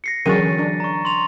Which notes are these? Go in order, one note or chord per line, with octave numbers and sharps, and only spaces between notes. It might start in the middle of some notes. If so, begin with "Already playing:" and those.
A#6 C7 C#7
D3 E3 F#3 C#4 G#4 A#4 A6 D#7
D4
A#5 C#6
C6 F7